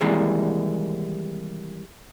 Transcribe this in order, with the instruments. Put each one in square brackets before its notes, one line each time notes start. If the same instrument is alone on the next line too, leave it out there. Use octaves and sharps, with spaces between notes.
[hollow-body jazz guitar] C3 D#3 E3 G3 G#3 A#3